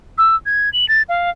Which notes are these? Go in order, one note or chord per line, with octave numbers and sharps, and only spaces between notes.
E6
G#6
F#7
A6
F5